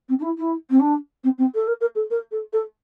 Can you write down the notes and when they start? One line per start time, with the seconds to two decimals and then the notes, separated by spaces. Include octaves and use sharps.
0.08 C4
0.19 D4
0.22 E4
0.37 E4
0.70 C4
0.79 D4
1.23 C4
1.38 C4
1.54 A4
1.67 A#4
1.80 A#4
1.95 A4
2.10 A#4
2.31 A4
2.53 A4